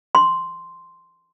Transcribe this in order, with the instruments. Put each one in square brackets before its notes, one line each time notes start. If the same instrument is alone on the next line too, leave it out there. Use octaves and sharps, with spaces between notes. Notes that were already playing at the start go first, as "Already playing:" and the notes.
[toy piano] C6